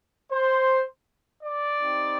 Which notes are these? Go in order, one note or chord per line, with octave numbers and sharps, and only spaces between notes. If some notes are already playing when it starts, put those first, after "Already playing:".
C5
D5
C4 D#4 G4